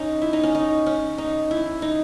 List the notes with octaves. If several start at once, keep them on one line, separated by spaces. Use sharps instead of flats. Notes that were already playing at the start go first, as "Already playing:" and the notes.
Already playing: C#4 D#4
E4
D#4
C#4
D#4
C#4
D#4
E4
D#4